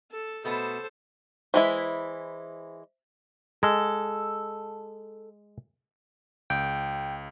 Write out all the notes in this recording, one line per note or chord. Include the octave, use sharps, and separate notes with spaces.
A4
B2 A3 B3 A4 C5
E3 G#3 E4 C5 E5 B6
G#3 A4
C#2 G5